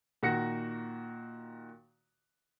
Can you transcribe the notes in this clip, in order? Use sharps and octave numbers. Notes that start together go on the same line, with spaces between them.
A#2 D#3 F#4 A#6 C#7